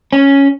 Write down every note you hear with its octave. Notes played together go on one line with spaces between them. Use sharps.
C#4